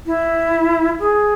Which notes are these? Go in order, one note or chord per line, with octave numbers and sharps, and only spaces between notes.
E4
G#4